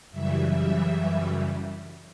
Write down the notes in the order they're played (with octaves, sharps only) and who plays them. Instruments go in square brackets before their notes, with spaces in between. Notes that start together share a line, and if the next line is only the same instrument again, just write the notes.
[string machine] F#2 C#3 E3 G3 E5